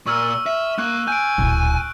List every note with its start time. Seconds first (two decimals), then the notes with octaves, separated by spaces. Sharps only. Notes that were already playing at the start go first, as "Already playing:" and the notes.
0.06 A#2 C#6 E6 F6
0.46 E5
0.78 A#3 C#6 F#6
1.08 G#5 G6 D7
1.38 D1 A#2